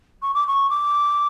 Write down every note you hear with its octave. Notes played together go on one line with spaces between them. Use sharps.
C#6
D6
C#6
D6